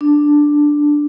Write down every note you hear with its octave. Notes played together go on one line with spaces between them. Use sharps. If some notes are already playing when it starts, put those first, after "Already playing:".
D4